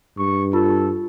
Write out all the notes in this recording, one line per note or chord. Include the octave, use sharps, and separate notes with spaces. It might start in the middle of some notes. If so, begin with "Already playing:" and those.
G2 C#6
F4 A4